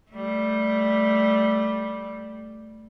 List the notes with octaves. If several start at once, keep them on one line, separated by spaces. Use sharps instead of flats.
G3 A3